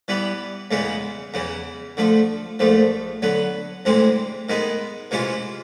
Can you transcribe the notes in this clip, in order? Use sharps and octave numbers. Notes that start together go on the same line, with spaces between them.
E3 G3 B3
E2 C#3 E3 G#3 B3
E2 C#3 E3
D3 F3 A3
A#1 G#2 F3 A3
D3 F#3 B3
D2 C3 E3 G#3 C4
D#3 G#3 B3 D#4
C3 E3 G#3 C#4 F4